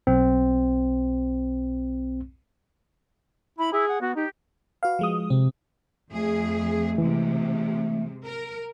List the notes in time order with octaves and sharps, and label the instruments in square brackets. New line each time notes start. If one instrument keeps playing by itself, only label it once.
[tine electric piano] B1 C4
[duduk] E4 [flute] B5
[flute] E4 [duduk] G#4
[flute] F#5
[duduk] B3 [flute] F#4
[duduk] D#4 [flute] G4
[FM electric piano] F#4 B4 F5
F3 G#3 D#6
[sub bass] C3 [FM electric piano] C4
[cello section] F2 G#4 [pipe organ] A3
[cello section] C3 G#3 [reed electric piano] E3
[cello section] A#4